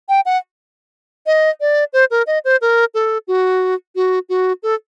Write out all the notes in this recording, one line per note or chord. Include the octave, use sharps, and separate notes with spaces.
G5
F#5
D#5
D5
C5
A#4
D#5
C5
A#4
A4
F#4
F#4
F#4
A4